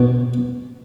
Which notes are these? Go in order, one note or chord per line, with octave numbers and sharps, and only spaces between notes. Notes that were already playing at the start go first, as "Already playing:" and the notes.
Already playing: B2